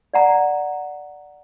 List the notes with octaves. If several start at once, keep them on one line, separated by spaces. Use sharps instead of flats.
D5 F#5 A#5